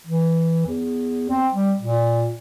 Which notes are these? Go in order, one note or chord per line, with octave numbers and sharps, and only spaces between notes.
E3
E2
C4
G3
A#2